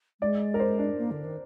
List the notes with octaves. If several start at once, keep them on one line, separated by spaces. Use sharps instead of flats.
G#3 D5
A#4
C5
D4
A#3
D3
D#3